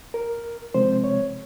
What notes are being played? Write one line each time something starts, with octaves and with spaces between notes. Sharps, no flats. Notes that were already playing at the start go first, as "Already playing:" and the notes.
A#4
C3 F3 G#3 C4 C5
C#5